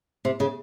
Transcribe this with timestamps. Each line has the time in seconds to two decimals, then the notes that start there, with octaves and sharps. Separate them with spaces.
0.25 C3
0.40 C#3